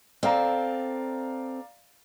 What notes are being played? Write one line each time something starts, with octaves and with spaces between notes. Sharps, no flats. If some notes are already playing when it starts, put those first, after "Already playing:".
C4 A4 D5 F5 A#5